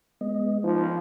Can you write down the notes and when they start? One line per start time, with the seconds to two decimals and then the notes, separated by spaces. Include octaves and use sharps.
0.21 G#3 B3 D#5
0.64 F3 D#4